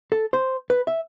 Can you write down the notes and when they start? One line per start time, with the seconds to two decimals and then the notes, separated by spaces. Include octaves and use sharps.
0.12 A4
0.33 C5
0.70 B4
0.87 E5